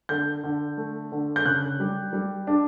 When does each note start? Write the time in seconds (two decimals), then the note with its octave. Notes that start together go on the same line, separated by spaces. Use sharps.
0.09 D3 G6
0.44 D3
0.77 A3
1.12 D3
1.36 G6
1.46 C#3 F#6
1.80 G3
2.13 G3
2.47 D4